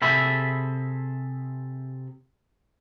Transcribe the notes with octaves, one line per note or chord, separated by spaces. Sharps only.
C3 G#4 A4 E5 B5